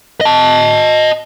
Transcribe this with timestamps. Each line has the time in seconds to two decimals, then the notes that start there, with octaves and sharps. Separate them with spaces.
0.21 D#5 A5